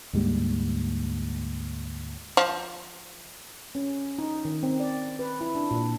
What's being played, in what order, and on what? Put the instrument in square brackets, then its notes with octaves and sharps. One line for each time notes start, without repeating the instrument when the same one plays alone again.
[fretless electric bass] D2 G#2 G3 A#3
[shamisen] F3
[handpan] C#4
D#4
D#3
C4
D5
B4
E4
D4
A#2